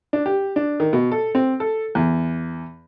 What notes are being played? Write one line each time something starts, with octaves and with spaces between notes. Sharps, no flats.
D4
G4
D4
D#3
B2
A4
C4
A4
E2